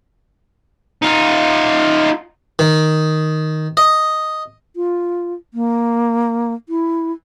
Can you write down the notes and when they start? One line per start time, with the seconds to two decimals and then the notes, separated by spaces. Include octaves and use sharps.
1.02 D#4 F4
2.59 D#3
3.77 D#5
4.76 F4
5.54 A#3
6.69 E4